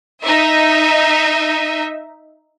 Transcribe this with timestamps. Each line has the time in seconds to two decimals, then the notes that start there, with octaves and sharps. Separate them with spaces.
0.24 D#4 E5